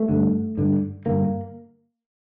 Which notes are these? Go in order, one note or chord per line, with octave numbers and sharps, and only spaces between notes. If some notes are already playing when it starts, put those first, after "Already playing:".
Already playing: A3
G2 D3
G2 D3
G2 D3 A#3